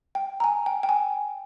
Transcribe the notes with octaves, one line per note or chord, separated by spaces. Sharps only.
G5
A#5
G#5
G5
G5
G#5